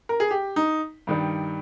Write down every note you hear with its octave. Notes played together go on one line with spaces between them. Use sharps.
A#4
G#4
G4
D#4
G2 D#3 G3